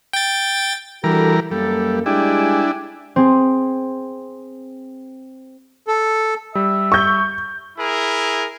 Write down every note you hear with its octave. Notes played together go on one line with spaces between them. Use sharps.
G5 A6
E3 G3 D4 F#4 A4 A#4
F#2 G3 A#3 A4
G3 G#3 D4 E4 G4 G5 G#5
C4 G#4 C6
A4
G3 E5
C#6 G6
E4 G#4 A#4